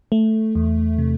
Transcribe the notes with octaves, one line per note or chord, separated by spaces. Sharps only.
A3
E2
C3